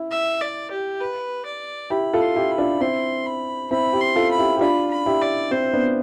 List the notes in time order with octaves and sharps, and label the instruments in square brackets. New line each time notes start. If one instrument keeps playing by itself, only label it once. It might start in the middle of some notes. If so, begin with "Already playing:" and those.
Already playing: [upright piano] E4
[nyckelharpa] E5
D5
G4
B4
D5
[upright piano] E4 G4 [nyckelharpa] B5
[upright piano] F4 A4
[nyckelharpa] C6
[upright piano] E4 G4
[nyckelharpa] B5
[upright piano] D4 F4
[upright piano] C4 E4 [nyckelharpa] C6
[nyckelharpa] B5
[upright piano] C4 E4 [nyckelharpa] B5
[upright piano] E4 G4
[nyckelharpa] C6
[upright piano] F4 A4
[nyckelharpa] B5
[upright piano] E4 G4
G4
[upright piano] D4 F4 [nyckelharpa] B5
[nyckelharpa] B5
[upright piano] E4 G4
[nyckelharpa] D5
[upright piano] C4 E4 [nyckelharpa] C5
[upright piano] B3 D4